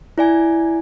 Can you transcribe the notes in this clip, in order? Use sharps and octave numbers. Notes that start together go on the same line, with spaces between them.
E4 D5 G#5